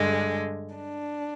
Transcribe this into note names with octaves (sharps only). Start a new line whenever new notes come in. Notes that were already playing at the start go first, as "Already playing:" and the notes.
Already playing: G2 D3 G#3
D4